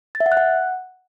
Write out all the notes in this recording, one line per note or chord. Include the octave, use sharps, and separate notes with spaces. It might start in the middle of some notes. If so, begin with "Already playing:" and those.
A6
E5
F#5
F#6
F#5